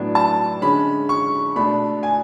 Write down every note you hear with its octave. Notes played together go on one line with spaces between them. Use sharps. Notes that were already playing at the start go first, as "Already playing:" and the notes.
Already playing: A2 F#3 B3 D4
A5
D3 G#3 C#4 B5
C#6
B2 A3 D4 B5
G#5